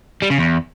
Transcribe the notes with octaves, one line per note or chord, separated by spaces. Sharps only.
G3
C#3
E2